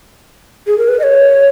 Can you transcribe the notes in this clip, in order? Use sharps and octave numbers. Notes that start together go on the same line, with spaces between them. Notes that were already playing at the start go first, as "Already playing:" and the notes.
G#4
A#4
B4
D#5
C#5